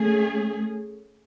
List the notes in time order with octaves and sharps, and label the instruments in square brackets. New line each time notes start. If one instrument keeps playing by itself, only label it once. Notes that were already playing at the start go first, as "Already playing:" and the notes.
Already playing: [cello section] A3 C#4 G#4